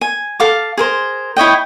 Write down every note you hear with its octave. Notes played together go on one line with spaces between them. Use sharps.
G#5
A4 F5 D6
G#4 A#4 C5
E4 C#5 D#5 G5